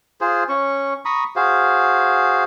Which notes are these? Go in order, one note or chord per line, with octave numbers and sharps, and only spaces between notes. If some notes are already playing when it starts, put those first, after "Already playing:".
F4 G#4 C5
C#4 C#6
A#5 B5 C#6 D#6
F#4 G#4 C5 F5